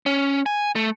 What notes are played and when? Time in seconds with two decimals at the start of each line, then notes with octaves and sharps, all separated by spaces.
0.06 C#4
0.46 G#5
0.76 A3